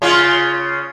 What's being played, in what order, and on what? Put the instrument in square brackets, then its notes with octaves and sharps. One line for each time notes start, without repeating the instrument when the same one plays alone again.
[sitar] C#3 F4